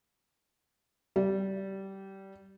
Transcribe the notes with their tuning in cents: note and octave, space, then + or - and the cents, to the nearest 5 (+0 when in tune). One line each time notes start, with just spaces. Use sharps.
G3 -20